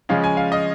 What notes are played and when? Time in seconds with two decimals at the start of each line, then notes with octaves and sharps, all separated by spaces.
0.09 C#3 F3 G#3 C#4 F5
0.24 G#5
0.37 F5
0.52 D#5